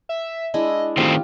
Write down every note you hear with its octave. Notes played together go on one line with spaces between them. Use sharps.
E5
G#3 D4 E4 D#5
D#3 A3 C4 F4 G4